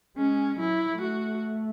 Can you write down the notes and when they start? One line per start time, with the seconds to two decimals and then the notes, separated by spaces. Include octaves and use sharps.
0.17 G#3 C#4
0.59 F#3 E4
1.01 A3 F#4